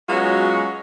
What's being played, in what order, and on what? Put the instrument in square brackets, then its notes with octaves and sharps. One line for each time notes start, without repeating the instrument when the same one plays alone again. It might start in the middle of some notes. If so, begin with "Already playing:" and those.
[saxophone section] F#3 G#3 B3 C#4 F4 F#4